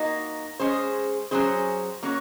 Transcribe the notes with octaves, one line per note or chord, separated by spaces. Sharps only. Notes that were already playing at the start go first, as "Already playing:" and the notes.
Already playing: A#3 D#4 F#4
G#3 C#4 G#4 C5
F#3 C#4 G#4 C5
A#3 C#4 F#4 C#5